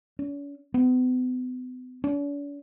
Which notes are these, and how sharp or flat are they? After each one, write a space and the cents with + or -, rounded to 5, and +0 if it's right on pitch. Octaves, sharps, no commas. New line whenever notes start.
C#4 +45
B3 +40
D4 -45